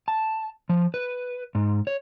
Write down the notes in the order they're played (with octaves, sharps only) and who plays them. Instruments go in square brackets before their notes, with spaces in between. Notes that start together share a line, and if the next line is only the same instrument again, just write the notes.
[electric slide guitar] A5
F3
B4
G#2
C#5